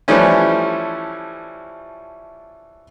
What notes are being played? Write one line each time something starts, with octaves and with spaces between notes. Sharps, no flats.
E3 F3 G3 A3 C#4